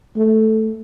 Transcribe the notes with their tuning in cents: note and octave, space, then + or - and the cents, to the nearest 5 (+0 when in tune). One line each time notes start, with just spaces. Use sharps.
A3 -5